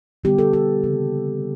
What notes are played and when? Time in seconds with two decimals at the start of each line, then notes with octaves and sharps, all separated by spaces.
0.24 D3 G3 B3 G4
0.38 A4
0.53 G4
0.83 C#3 E3 G3 A#3